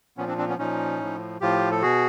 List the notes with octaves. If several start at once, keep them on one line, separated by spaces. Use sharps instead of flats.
A#2 F3 B3 C#4
C4 D4
C4 D4
B3 C#4
A#2 F3 C#4 D#4
A2 F3
A2 F3 F4 G4
A4
B2 F#4 G#4